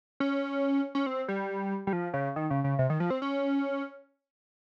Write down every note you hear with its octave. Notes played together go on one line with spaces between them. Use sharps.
C#4
C#4
C4
G3
G3
F3
C#3
D#3
C#3
C#3
C3
D#3
F3
C4
C#4